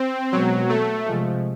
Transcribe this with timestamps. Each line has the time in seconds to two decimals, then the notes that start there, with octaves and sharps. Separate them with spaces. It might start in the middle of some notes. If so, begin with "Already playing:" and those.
Already playing: C4
0.32 B2 F#3 G#3 B3
0.69 A3
1.07 C3 F3 G#3